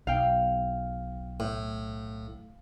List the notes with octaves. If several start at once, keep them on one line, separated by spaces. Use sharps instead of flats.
B1 F5 G5
A2